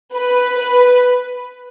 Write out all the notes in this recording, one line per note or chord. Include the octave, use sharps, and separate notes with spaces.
B4
B4